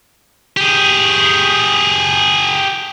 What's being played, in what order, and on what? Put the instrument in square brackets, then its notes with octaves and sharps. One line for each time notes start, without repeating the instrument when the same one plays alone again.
[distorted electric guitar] G4 G#4